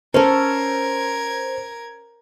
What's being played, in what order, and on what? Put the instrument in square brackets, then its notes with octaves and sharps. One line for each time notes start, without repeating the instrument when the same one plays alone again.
[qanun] C#4 A4 [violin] A#4 G#6 [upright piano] C5